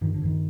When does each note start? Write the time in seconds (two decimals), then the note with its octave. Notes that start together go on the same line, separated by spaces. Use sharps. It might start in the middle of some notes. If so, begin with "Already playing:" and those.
0.01 G2 D#3
0.14 D3
0.22 G2 D#3